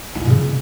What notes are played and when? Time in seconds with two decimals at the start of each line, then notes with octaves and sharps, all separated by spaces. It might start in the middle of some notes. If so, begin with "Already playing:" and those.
0.15 D#4
0.20 E4
0.25 B2
0.30 C#3